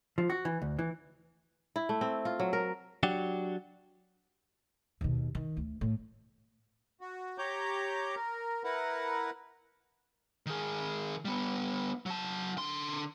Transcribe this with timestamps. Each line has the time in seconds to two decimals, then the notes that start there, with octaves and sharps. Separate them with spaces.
0.18 F3
0.30 F#4
0.45 E3
0.62 D2
0.79 E3
1.76 E4
1.89 A3
2.01 C4
2.25 F4
2.40 F#3
2.53 A#4
3.03 F#3 D4 F#4 G4
5.01 D#2 B2
5.35 D#3
5.57 D2
5.81 A2
7.01 F#4
7.38 G4 C#5 A#5 D6 G6
8.15 A#4
8.64 E4 A#4 B4 F#5
10.46 D#3 G#4
11.25 G3 B3
12.06 F#3 A5
12.57 D3 C6